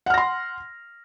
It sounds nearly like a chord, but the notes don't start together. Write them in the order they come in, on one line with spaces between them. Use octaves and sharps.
F#5 F6 A#6 C6